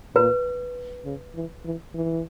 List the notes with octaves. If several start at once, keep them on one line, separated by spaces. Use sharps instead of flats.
A#2 B4
C#3
E3
E3
E3